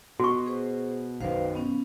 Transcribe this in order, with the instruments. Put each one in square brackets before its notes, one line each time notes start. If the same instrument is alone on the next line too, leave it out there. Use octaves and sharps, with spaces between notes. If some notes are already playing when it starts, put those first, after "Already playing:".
[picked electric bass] B2 [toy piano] F#4 C#6
[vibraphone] G#4 C5
[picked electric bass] B1 F#2 D#3 [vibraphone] B4 C5 F5
[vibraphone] B3 C#4